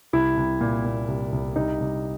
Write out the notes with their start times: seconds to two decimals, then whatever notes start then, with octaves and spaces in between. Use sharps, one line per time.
0.13 C2 E4
0.37 C2
0.61 A#2
0.84 A#2
1.08 C2
1.32 C2
1.56 C2 D#4
1.80 C2